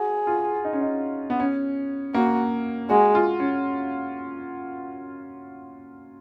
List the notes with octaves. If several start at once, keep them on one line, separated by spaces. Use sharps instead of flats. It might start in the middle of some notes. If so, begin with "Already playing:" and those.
Already playing: F#4 G#4
F4
D#4
C#4
D#4
B3
C#4
A#3 F#4
G#3 F#4
F4
C#4